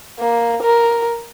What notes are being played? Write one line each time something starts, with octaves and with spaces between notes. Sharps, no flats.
A#3
A#4